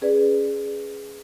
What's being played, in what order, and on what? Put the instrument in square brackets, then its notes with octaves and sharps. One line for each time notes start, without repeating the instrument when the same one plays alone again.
[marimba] C#4 G#4 B4 D5